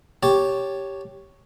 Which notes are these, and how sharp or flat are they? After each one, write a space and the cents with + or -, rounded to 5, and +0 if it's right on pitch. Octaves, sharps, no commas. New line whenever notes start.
G4 +0 C#5 +0 A5 -10